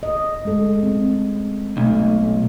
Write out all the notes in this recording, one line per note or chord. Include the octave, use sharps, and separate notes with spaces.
D#5
G#3 C#4 A4
C4
B1 A3